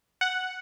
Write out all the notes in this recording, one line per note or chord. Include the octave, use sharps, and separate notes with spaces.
F#5